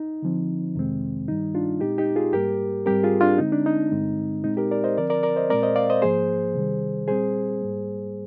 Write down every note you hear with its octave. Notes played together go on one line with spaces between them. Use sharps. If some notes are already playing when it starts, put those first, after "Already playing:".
Already playing: D#4
D3 F3 C4
F2 C3 D#3 G#3 C4
G2 D#3 G3 D#4
D4 F4
A#2 G#3 C4 D#4 G4
D#4 G4
F4 G#4
G#2 G3 A#3 G4 A#4
G#2 G3 C4 G4 A#4
F4 G#4
D4 F4
D3 G#3 C4 D#4
D4
D#4
G2 D3 G#3 C4
A#2 G#3 C4 D#4
G4 A#4
A#4 D5
C5 D#5
D3 F3 C4 A#4 D5
A#4 D5
A#4 D5
C5 D#5
A#2 G#3 C4 A#4 D5
C5 D#5
D5 F5
C5 D#5
G#2 F3 A#3 G#4 C5
C3 D#3 G3
A#2 G3 C4 G#4 C5
G#2 G3 A#3